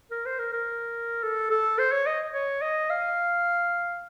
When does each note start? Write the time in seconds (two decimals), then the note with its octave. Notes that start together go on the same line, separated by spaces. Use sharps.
0.11 A#4
0.26 C5
0.39 A#4
0.53 A#4
1.23 A4
1.50 A4
1.79 C5
1.92 C#5
2.06 D#5
2.34 C#5
2.62 D#5
2.90 F5